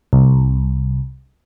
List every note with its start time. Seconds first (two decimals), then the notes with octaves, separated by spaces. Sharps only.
0.13 C2